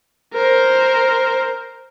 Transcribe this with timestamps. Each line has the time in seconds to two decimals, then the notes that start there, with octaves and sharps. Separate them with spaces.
0.34 A#4 C5